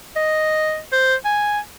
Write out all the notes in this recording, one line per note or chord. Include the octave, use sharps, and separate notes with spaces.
D#5
C5
G#5